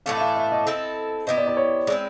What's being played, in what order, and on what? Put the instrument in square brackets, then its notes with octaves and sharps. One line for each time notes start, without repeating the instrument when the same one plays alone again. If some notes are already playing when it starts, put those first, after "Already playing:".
[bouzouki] A2 E3 A3 D4 [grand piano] F5
[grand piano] E5
F5
E5
D#5
[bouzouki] C4 E4 A4
[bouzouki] B3 E4 G4 C5 [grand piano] D#5
[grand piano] D5
D5
C#5
[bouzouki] G#3 C4 E4 [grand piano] D5